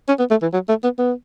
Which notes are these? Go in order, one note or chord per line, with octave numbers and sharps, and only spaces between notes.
C#4
B3
A3
E3
F#3
A3
B3
B3